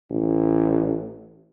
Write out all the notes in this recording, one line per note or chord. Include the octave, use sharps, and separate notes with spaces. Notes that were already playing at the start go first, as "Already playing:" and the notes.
A1